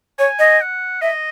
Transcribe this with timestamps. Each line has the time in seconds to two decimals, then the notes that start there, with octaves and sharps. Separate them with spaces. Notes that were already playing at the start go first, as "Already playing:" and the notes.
0.19 C#5 G#5
0.39 D#5
0.61 F#5
1.01 D#5 E5